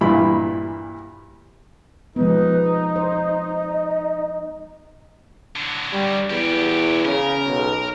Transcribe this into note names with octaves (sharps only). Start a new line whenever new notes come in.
G2 A#2 E3 G3 E4 B5
F3 G#3 B3 D#4 B4
C5 D#5
D3 F#3
G3
E2 F#3 G4
C#3 A#4
B1